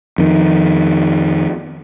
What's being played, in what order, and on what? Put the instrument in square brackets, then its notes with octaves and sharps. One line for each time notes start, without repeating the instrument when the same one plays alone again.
[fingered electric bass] F2 D#3